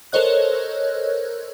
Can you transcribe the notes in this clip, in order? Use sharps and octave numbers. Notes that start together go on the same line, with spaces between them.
A4 A#4 C5 C#5 D#5 F#6